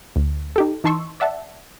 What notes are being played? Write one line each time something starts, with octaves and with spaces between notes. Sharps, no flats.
D2
D#4 G4 A4
E3 D#4 A5 C6 C#6 E6
D5 E5 F#5 A5